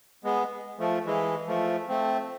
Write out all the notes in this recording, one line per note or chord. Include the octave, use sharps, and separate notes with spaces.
G#3 B3
F3 A3
E3 G#3
F3 A3
A3 C4